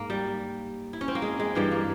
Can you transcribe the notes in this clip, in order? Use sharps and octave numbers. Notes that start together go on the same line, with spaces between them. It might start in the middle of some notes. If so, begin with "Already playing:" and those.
Already playing: G#2 A#3
G3
E4
C#4
C4
A#3
G#3
G#3
G2 E3 G3 A#3
A#3